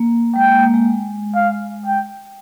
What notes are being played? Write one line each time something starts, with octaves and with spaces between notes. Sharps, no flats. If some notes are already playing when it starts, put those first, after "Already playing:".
Already playing: A#3
G#3 G5
A#3
A#3
G#3
F5
G5